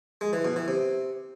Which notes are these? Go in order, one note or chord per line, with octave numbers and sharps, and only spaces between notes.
G#3
E3
B2
E3
C3